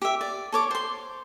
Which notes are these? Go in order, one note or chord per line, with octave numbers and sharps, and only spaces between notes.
G4 E5
D5
A4 C#5 D6
C5 C6